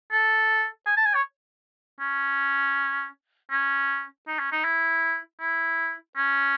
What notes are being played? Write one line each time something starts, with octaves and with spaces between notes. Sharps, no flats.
A4
G#5
A5
G#5
C#5
C#4
C#4
D#4
C#4
D#4
E4
E4
C#4